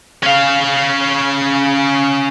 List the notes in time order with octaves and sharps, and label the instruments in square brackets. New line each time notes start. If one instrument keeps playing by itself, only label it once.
[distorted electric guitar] C#4 F5